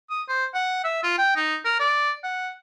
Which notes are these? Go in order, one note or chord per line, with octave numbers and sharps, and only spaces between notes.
D#6
C5
F#5
E5
F4
G5
D#4
A#4
D5
F#5